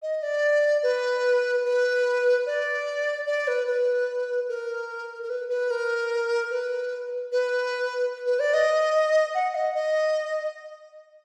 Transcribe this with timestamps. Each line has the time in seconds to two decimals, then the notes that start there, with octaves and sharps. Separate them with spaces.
0.02 D#5
0.22 D5
0.82 B4
1.64 B4
2.46 D5
3.26 D5
3.47 B4
3.67 B4
4.48 A#4
5.22 A#4
5.29 B4
5.49 B4
5.70 A#4
6.50 B4
7.32 B4
8.26 B4
8.39 D5
8.53 D#5
9.34 F#5
9.54 D#5
9.74 D#5